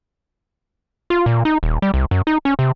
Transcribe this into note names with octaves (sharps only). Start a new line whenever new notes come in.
F4
A#2
D#4
D#1
G3
C2
F#2
D#4
C#4
C3